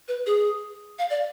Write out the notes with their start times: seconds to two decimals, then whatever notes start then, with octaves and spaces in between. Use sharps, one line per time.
0.08 B4
0.26 G#4
0.99 F5
1.10 D5